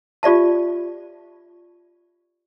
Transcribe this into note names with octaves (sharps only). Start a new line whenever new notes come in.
F4 G4 D5 E5 A5